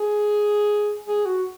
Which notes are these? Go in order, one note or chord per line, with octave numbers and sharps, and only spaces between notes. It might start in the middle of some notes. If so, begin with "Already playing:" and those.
Already playing: G#4
G#4
F#4